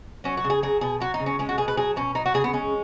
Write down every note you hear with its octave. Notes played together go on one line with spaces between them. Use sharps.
F#3 C#4
F#4
C#3
G#4
F#3 G#4
B2 G#4
F#3 F#4
D#4
C#3
C#4
G#3 C#4
F#4
B2 G#4
B4
F#3 G#4
B2 C#4
F#3 D#4
F#4
C#3 G#4
B3
G#3 C#4